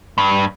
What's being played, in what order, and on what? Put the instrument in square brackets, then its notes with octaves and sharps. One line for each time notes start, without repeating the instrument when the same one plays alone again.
[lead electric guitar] G2